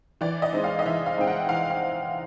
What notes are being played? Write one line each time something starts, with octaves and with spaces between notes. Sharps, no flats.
E3 D5
D#5
G#3 C4 D#4
F5
D#5
E3 E5
F5
G#3 C4 D#4 G5
F#5
E3 F5
F5